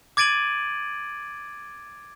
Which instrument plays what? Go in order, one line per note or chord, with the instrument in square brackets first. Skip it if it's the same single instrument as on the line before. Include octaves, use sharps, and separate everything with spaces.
[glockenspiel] D6 G#6 A6 D7 D#7 F#7